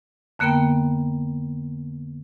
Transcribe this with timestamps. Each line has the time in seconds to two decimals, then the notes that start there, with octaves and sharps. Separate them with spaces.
0.39 F2 D3 A#3 B3 A#4 G5